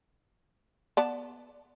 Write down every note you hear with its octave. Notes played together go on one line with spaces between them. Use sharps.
B3 D5 A5